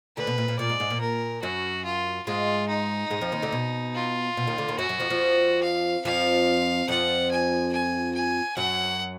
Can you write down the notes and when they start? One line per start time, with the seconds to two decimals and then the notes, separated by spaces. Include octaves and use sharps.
0.17 D2 D3 B4
0.27 B2
0.38 A#2
0.48 A#2
0.59 A#2 D5
0.70 G#2
0.80 G#2
0.90 A#2
1.01 A#4
1.43 F#2 F#3 F#4
1.85 F4
2.27 G#2 G#3 F4
2.69 D#4
3.10 G#2 G#3
3.21 F2 F3
3.32 D#2 D#3
3.42 D2 D3
3.52 B2
3.95 F4
4.37 B2
4.47 D#2 D#3
4.58 D2 D3
4.68 D#2 D#3
4.79 F#2 F#3 F#4
4.89 F#2 F#3
5.00 F2 F3
5.10 F2 F3
5.63 F5
6.05 F2 F3 F5
6.88 F2 F3 F#5
7.31 G#5
7.73 G#5
8.15 G#5
8.57 F#2 F#3 F#5